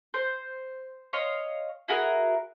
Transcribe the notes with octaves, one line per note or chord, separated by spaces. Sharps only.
C5
C#5 D#5 F5 C6
E4 F#4 G#4 A#4